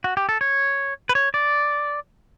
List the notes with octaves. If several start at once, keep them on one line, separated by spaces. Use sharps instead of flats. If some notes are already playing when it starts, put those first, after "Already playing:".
F#4
G4
A4
C#5
B4
C#5
D5